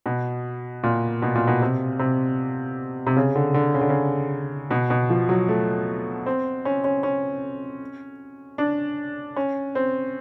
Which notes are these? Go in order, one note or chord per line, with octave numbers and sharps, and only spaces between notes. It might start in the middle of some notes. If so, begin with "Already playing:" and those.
B2
A#2
B2
A#2
B2
C3
C3
C3
C#3
D3
D3
C#3
D3
C#3
B2
B2
F3
F#3
A3
C4
C#4
C#4
C#4
D4
C#4
C4